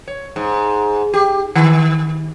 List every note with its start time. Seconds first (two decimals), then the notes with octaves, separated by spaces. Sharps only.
0.08 C#5
0.36 G#2
1.14 G4
1.55 D#3